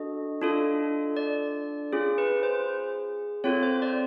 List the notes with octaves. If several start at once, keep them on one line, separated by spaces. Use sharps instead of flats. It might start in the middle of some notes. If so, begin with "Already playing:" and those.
Already playing: D4 F#4 A4 D#5
D4 F4 A4
D5
C#4 F4 G#4
B4
C5
C4 F4 A4 C#5
C5
D5